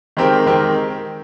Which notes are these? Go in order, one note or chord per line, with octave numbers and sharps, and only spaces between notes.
D#3 G#3 C4 G4 A#4
D#3 G#3 C4 G4 A#4